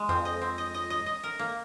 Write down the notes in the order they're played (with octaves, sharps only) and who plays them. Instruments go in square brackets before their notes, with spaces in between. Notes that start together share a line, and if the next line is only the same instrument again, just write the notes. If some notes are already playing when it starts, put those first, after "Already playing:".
Already playing: [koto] G#3
[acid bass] F2 [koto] C4
[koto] D#5
C4
D#5
D#5
D#5
D#5
A#4
A#3